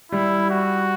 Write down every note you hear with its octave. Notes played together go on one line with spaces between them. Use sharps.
G3 E4
F#4